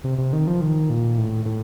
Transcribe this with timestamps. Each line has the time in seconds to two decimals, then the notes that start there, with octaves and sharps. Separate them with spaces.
0.04 C3
0.18 C3
0.33 D#3
0.47 F3
0.61 D#3
0.90 A#2
1.18 A2
1.46 A2